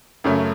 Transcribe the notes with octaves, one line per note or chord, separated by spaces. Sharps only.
F#2 C#3 F#3 A3